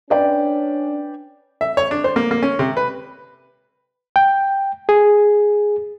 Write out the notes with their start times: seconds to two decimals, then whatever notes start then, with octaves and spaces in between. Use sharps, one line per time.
0.10 C#4 D4 B4 D5 G5
1.61 E5
1.77 C#5
1.91 D4
2.04 C5
2.16 A#3
2.31 A#3
2.43 C#4
2.59 C3
2.77 B4
4.16 G5
4.89 G#4